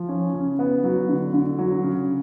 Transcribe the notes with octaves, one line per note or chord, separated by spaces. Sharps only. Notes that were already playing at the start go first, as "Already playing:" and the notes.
Already playing: F3
C#4
C#3
B3
F#3
D3
D3
F#3
C#3